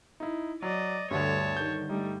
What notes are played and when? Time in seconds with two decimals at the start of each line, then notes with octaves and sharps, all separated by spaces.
0.20 D#4 E4
0.62 F#3 D5 D#5
1.11 D2 G2 D3 C#5 A5
1.57 D#3 G6
1.89 G3 A3 D#4